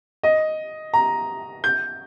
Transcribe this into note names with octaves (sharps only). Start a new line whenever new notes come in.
D#5
A#5
G6